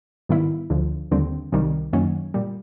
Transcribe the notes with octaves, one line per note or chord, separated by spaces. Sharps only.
G#2 D#3 G3 B3 E4
D2 D3 F3
D#2 D3 G3 C4
C2 C3 D#3 G3
F#2 D#3 F#3 A#3 C#4
A#2 G3